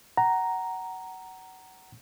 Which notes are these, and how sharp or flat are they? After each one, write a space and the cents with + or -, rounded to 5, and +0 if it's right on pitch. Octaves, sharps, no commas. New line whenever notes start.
F#5 +25 A#5 +0